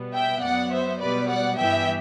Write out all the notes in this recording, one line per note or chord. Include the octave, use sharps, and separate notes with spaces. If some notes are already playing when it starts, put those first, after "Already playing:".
Already playing: B2 G3 B3
E5 G5
F#2 F#3 B3 D5 F#5
C5 E5
B2 G3 B3 B4 D5
D5 F#5
G2 E3 B3 E5 G5